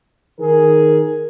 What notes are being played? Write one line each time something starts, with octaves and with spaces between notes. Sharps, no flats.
D#3 G#4 A#4